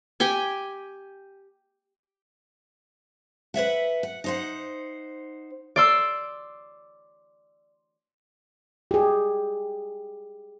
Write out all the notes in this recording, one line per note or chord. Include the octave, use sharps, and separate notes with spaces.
G4 G5 G#5
B4 C#5 E5 F#5
F#5
D#4 C5 F#5
D5 C6 E6
G4 G#4